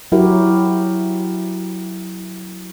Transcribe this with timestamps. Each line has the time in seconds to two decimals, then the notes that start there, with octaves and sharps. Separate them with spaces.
0.12 F#3 E4 F#4 G4 A#4